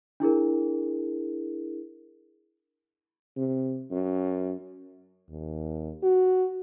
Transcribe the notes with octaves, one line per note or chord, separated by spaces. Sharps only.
D4 E4 G#4 A#4
C3
F#2
D#2
F#4